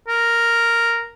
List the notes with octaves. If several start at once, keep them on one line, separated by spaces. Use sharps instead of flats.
A#4